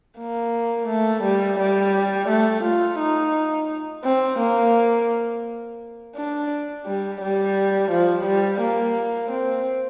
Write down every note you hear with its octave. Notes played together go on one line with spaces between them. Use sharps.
A#3
A3
G3
G3
A3
F4
D#4
C4
A#3
D4
G3
G3
F3
G3
A#3
C4